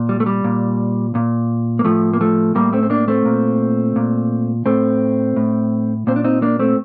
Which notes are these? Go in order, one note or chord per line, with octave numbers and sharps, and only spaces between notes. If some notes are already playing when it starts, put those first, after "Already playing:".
Already playing: A#2
G3
A3
G3
A#2
A#2
A#3
A2 F3 A3
A#3
F3 A3
A2 G3 A#3
A3 C4
C4
A#3 D4
A3 C4
A#2
A#2
A2 A3 C4
A2
A#2 C4
D4
C4 D#4
A#3 D4
A3 C4